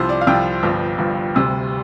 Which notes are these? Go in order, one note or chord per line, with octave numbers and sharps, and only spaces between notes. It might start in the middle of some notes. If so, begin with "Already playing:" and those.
Already playing: C2 C3 F3 C5
D5
F5
C2 C3 F3 G5
G1 G2 F3
G1 G2 F3
D2 C3 G3